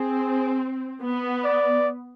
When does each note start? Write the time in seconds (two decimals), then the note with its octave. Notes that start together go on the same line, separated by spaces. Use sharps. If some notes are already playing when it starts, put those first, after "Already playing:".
Already playing: C4 G#4
1.02 B3
1.44 D5